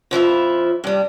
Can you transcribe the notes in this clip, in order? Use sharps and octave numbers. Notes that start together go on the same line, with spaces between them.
F2 F3 E4 E5
G2 G3